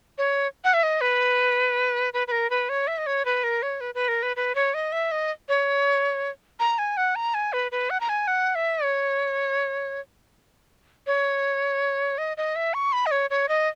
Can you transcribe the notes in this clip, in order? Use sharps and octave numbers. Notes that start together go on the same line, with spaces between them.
C#5
F#5
E5
D#5
B4
B4
B4
A#4
B4
C#5
E5
D#5
C#5
B4
A#4
C#5
B4
B4
A#4
B4
B4
C#5
D#5
E5
D#5
C#5
A#5
G#5
F#5
A#5
G#5
B4
B4
F#5
A#5
G#5
F#5
E5
C#5
C#5
D#5
D#5
E5
C#6
B5
D#5
C#5
C#5
D#5